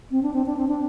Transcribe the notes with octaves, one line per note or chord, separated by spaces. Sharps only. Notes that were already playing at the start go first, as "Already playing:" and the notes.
C4
D4
C4
D4
C4
D4